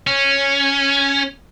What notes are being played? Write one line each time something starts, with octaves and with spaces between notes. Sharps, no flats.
C#4